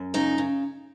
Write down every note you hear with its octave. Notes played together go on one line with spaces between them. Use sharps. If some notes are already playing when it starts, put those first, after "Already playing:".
Already playing: F#2
C#3 D#4
C#3